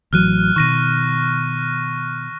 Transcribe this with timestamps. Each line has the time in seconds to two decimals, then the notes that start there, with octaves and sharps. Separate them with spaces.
0.13 A1 E3 F#3 F6 F#6 D#7
0.56 B2 D#3 C#6 A#6 D#7